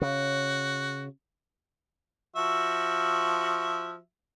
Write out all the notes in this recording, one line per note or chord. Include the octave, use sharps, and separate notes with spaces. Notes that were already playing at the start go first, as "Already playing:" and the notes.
C#3 F#4
F3 F#4 E5